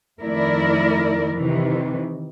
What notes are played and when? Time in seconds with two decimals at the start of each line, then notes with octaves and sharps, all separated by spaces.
0.22 F2 D#3 A3 E4 A#4 D5
1.35 C3 D#3 E3